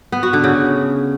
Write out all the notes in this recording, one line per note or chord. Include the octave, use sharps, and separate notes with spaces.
B3
F#4
D3
C#3